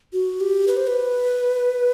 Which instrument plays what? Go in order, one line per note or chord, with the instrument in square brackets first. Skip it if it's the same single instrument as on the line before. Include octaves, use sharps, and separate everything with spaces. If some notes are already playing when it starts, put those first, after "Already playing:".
[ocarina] F#4
G4
B4
C5
B4